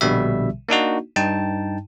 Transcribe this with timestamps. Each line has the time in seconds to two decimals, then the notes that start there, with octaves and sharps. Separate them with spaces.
0.01 A#1 B2 D3 G3 E5
0.69 A#3 D4 D#4 F#4
1.16 G2 D#4 G5 A5